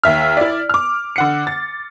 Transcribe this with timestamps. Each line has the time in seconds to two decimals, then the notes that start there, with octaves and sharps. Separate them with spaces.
0.04 D#2 E5 F6
0.37 E4 D5
0.69 D6 F6
1.16 D3 F#5 C#7
1.47 A6